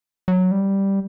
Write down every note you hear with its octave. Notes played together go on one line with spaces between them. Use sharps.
F#3
G3